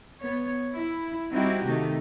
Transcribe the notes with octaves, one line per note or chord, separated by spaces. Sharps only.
B3 C#5
E4
G3 C4 D#4 E4 F#4 G4
C3 D#3 A3 D#4